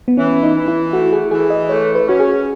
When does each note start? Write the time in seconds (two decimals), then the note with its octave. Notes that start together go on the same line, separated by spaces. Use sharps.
0.08 B3
0.17 E3 C#4
0.43 D#4
0.55 E3
0.68 E4
0.93 A3 F#4
1.13 G#4
1.31 E3 G#4
1.50 D#5
1.69 A3 C#5
1.95 B4
2.08 C#4 F#4
2.20 G#4